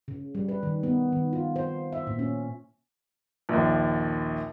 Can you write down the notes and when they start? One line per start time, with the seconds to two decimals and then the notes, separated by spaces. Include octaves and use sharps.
0.08 C#3
0.35 G3
0.49 B4
0.63 D#3
0.83 B3
1.13 D#3
1.33 F4
1.56 C5
1.92 E5
2.07 A#2
2.19 C#4
3.49 A#1 D#2